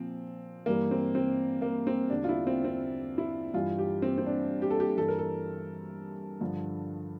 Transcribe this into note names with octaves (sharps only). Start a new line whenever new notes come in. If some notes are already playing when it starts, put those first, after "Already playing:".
Already playing: A#2 F3 C4
G2 E3 G3 A#3
C4
C4
A#3
C4
E2 D3 G3 D4
F4
E4
C4
C4
E4
G2 E3 G3 F4
G4
C4
C4
D4
G4
A4
G4
G2 E3 G3 A4
A#4
A4
G2 D3 F3